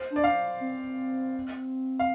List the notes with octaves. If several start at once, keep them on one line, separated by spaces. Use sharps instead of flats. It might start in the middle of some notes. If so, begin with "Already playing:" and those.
Already playing: C5
D4
D5
F5
C4
F5